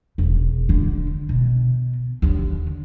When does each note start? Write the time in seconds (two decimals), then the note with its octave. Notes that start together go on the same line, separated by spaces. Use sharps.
0.18 E1
0.69 D3
1.29 B2
2.22 D#2 D3